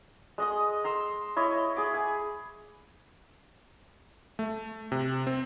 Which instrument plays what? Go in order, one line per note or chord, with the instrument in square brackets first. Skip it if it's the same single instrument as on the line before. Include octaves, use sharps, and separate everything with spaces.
[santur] G#3 D#5 D#6
A#5 C6 E6
E4 C#5 D#5
G#4 D6
G#5
[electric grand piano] A3
C3
C4